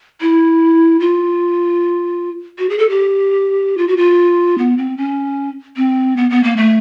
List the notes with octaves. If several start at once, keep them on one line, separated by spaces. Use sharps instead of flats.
E4
F4
F#4
G#4
A4
G4
F4
F#4
F4
B3
C4
C#4
C4
B3
B3
A#3
A3